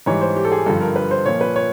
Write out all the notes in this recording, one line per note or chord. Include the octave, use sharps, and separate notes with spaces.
G#2 E3 G3 C#5
C5
G4
A4
G#4
G2 D3 F3 A4
A#4
B4
C5
A#2 F3 C#5
B4
C#5